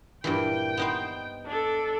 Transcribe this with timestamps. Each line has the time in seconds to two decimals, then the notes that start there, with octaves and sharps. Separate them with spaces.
0.24 G2 A#2 E3 G5
0.77 B3 D#4 C5
1.46 D4 A4